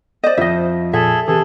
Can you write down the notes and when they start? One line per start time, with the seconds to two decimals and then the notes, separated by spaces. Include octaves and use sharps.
0.24 C5 D5 D#5
0.38 F2 F3 D#5 E5
0.93 A#2 G#4 A4 E5
1.28 C3 E3 G#4 A4